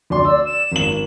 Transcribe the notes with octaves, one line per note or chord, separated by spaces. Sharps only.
D2 D5 C6
D5 E6
E7
G#1 F#7